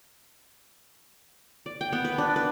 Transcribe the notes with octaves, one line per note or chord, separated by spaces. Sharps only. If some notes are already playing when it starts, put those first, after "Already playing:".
D5
G5
B3
B4
D4
B4